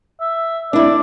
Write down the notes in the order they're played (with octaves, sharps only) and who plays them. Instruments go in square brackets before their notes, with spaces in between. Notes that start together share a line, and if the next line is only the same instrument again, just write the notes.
[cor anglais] E5
[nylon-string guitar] D4 E4 [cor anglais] D5